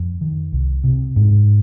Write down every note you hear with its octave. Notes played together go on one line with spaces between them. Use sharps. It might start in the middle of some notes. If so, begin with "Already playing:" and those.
Already playing: F2
D#3
C2
C3
G#2